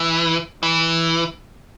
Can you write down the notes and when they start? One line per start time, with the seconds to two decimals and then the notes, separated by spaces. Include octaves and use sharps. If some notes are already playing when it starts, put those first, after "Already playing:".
Already playing: E3
0.63 E3